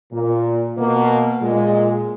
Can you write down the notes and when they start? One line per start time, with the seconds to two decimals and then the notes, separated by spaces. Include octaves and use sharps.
0.13 A#2
0.77 B2 A#3
1.42 A#2 G#3